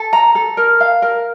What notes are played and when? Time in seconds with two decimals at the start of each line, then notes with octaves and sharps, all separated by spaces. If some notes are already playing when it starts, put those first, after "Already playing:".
Already playing: A4
0.13 A#5
0.35 A4
0.57 A#4
0.80 F5
1.02 A#4